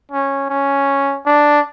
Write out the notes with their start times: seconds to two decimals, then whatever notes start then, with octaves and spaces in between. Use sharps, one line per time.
0.12 C#4
0.50 C#4
1.26 D4